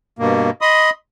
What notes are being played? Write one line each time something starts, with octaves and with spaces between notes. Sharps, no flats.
G2 B2 A#3
D#5 B5 C6 D#6